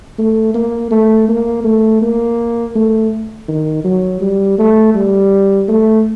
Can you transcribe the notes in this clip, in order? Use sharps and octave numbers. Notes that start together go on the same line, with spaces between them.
A3
A#3
A3
A#3
A3
A#3
A3
D#3
F#3
G3
A3
G3
A3